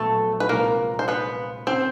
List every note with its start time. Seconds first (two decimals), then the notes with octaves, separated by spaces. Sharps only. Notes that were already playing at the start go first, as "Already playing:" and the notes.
Already playing: A#1 A#2 F#3 A3 B3 A4
0.40 B4
0.49 C2 A#2 F3 G#3 A#3 A#4
0.99 C5
1.08 B3 B4
1.67 C#3 C4 C5